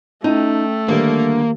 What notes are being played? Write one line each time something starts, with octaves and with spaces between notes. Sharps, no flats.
A3 C#4 D#4 G5
D3 D#3 G3 A#3 G4